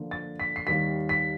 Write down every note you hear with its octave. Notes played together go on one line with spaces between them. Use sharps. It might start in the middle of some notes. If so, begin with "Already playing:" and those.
Already playing: D3 F3 A#3 D4 F4
A6
B6
C7
D#2 D#3 G3 B6
B6